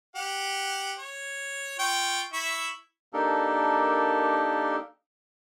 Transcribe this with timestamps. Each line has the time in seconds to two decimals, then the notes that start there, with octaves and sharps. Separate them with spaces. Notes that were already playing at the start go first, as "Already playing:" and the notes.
0.16 G4 F#5
0.99 C#5
1.79 F4 G5 C#6
2.33 E4 E5 C#6
3.13 A#3 D4 D#4 G4 A4 A#4